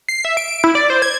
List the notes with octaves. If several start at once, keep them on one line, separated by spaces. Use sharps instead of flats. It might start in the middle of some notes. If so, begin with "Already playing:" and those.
C7
E5
D7
E4
D5
C5
G#6